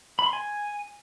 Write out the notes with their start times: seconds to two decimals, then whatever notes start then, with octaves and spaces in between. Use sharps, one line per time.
0.19 B5
0.26 C6
0.33 G#5